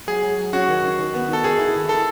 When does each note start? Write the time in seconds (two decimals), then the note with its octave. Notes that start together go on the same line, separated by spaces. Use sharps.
0.07 F#3 G#4
0.23 F#3
0.38 F#3
0.53 C#4 F#4
0.68 D#3
0.83 D#3
0.99 D#3
1.14 B3
1.28 D#3 A4
1.44 D#3 G#4
1.59 E4
1.74 E4
1.89 D#3 A4